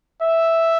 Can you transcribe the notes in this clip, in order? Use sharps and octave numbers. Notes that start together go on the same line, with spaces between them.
E5